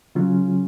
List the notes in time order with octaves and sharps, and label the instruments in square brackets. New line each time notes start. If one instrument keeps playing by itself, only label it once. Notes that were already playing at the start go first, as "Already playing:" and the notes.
[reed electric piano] C#3 F#3 C#4 F4